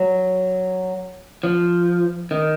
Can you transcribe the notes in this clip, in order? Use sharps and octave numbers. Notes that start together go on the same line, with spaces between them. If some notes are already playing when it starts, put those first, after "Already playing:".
Already playing: F#3
F3
D#3